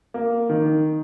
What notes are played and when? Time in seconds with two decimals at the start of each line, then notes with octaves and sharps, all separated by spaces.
0.14 A#3
0.49 D#3